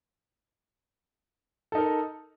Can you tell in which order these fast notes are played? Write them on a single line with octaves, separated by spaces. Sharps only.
A4 D#4 A#4